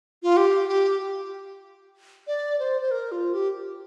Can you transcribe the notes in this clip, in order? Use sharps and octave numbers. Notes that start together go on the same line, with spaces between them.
F4
G4
G4
D5
C5
C5
A#4
F4
G4